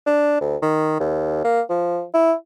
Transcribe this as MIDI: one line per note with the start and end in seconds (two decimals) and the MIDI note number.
0.06 0.38 62
0.41 0.57 38
0.62 0.96 51
1.00 1.41 39
1.44 1.61 58
1.69 2.04 53
2.14 2.34 64